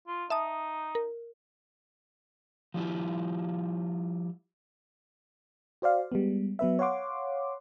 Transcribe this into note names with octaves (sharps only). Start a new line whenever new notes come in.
F4
D#4 E5 A5 D#6
A#4
F3 G3 E4 F4
F#4 C5 D5 F5
G3 G#3 B3
F#3 B3 B4 E5
C#5 F5 F#5 C6 D6